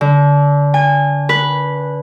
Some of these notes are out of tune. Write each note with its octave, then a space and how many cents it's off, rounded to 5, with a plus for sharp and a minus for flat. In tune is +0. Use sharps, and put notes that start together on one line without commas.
D3 -30
G#5 -35
B4 -10